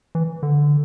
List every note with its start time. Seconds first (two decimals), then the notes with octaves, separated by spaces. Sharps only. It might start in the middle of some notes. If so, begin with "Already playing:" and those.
0.15 E3
0.43 D3